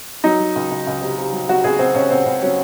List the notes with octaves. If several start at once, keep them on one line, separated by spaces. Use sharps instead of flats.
F#3 D#4
F#3
C#2
C#2
C#2
C3
C3
F#3
F#3 F#4
C#2 G#4
C#2 C4
C#2 C#4
C#2 C4
C#2
F#3 C#4